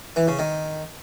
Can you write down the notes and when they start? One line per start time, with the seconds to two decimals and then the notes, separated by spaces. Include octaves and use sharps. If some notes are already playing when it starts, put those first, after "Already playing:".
0.16 E3
0.28 C#3
0.39 D#3